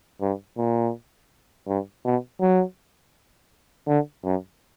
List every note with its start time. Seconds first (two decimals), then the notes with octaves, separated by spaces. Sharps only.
0.21 G2
0.58 A#2
1.67 G2
2.05 B2
2.41 F#3
3.88 D3
4.24 F#2